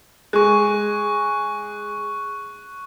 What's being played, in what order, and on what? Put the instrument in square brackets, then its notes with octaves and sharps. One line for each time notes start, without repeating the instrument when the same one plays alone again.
[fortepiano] G#3 [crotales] C#6 F#6